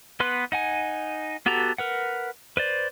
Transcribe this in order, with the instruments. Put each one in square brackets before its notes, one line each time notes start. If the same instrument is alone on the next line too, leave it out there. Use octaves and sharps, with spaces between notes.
[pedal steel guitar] B3 B4 C6 F#6
D#4 F#5 G#5
B3 F#4 G4 A4 A#5
A#4 B4 F#5
B4 C5 D5